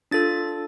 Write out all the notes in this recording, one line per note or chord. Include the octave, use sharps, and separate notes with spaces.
D4 F4 A4 A6